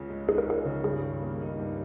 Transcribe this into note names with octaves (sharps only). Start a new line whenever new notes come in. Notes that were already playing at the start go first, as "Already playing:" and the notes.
Already playing: C#2 C#3
G#3
D#4 G#4
A#4
C#2 G#4
C#3
G2 G#4
D#3
A#3
D#4
G2